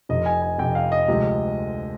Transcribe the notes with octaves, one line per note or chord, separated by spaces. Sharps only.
F1 F2 C3 D#5
G#5
G#5
F1 F2 C3 G5
F5
D#5
D2 C3 F3 G#3